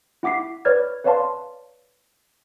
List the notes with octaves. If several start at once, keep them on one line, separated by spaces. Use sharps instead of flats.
E4 F#5 D6 B6 C7
B4 C#5 D5 F6 G#6 A6
B4 C#5 D5 F5 A5 C6